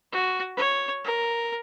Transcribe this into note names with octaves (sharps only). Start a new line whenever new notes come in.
F#4
C#5
A#4